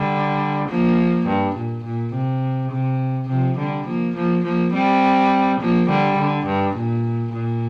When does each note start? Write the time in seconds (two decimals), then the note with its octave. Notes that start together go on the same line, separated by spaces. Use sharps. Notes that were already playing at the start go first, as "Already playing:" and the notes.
Already playing: D3 G3
0.69 F3 A#3
1.27 G2
1.56 A#2
1.85 A#2
2.14 C3
2.72 C3
3.29 C3 F3
3.58 D3 G3
3.87 F3 A#3
4.16 F3 A#3
4.45 F3 A#3
4.74 G3 C4
5.60 F3 A#3
5.89 D3 G3
6.18 D3
6.47 G2
6.76 A#2
7.34 A#2